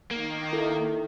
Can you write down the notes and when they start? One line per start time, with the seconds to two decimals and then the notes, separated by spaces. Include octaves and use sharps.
0.11 D#3 A#3
0.53 E4 A4